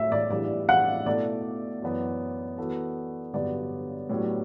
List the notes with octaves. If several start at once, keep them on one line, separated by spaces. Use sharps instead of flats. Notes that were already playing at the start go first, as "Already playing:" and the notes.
Already playing: A2 F#3 A3 E5
D5
A2 E3 G3 D4 D5
F#5
B2 A3 E4 A4 D5
F#2 E3 B3
E3 B3 F#4 A4
G2 D3 F#3 B3 D5
A2 F#3 B3 D4 G4